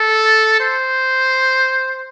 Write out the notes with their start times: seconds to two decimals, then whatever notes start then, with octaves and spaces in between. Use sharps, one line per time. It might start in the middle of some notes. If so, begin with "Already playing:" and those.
Already playing: A4
0.60 C5